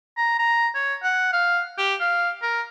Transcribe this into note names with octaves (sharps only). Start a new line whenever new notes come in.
A#5
A#5
C#5
F#5
F5
G4
F5
A#4